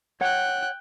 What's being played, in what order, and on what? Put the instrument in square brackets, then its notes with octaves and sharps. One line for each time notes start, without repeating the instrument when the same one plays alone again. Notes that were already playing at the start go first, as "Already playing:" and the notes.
[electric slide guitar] C#5 F#5 [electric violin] G5 F#6